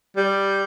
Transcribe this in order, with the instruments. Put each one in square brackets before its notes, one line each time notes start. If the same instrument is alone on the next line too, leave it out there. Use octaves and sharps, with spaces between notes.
[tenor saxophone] G3